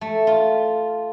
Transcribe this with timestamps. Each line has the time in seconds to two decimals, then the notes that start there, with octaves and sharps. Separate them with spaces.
0.01 A3
0.27 F4